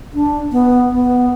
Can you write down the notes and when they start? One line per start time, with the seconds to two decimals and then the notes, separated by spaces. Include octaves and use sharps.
0.14 D4
0.52 B3
0.92 B3